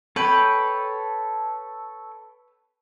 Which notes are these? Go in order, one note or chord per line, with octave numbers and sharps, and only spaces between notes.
A4 B4 C#5 G5